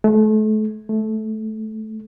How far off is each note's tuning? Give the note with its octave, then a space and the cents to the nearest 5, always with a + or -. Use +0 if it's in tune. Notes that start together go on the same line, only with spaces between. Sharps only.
A3 -35
A3 -15